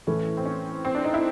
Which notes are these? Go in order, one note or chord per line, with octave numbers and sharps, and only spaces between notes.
A2 E3 A3 C#4
C4
C#4
C4
D4
D#4
E4